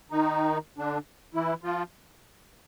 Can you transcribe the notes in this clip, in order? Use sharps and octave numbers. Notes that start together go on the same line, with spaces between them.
D#3 D#4
D3 D4
E3 E4
F3 F4